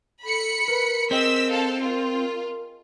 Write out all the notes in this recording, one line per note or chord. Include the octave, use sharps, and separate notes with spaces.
A4 B5 C#7
A#4 B4
C4 G#4 A#4 D#5 G5 E6 B6
A4 F5
F4 A#4